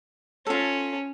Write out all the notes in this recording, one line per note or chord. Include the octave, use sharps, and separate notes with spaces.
C#4 F4 A4